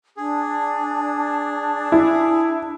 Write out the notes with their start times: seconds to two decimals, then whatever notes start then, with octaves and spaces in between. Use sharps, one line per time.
0.17 D4 G#4
1.92 E4